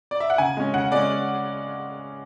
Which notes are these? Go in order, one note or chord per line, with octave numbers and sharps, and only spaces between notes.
D5
E5
F#5
C#3 G#5
G#3 C#4
C#3 F#5
G#3 C#4 D5